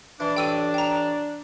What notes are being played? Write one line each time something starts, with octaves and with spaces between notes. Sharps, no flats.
E3 D4
A1 G5 E6 D#7
G5 A#5